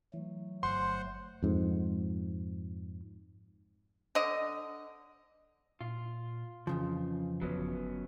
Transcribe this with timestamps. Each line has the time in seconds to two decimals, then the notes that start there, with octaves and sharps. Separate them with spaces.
0.14 E3 F#3 A3
0.63 G1 C5 F#5 C6
1.43 F2 G#2
4.15 D3 D#5
5.81 A#2 F4
6.67 F2 C#3 E3 F3
7.42 G1 F#3 B3 C#4